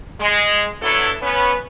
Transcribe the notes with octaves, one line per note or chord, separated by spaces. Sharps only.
G#3
F#3 B3 D4 E4 A4 C#5
B3 C#4 B4